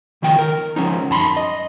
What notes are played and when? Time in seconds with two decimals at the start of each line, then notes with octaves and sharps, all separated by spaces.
0.22 C#2 D#3 F3 G5
0.39 A#4
0.76 F3 C#4 D#4
1.10 F#2 A5 B5 C6
1.37 D#5